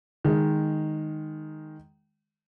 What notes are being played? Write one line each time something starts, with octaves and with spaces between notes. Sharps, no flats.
D#3 G#3